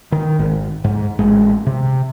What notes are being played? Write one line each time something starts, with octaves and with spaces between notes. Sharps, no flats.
D#3
G#1
G#2
A1 G#3
C3